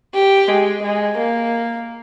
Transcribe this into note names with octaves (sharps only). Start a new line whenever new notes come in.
G4
G#3
G#3
A#3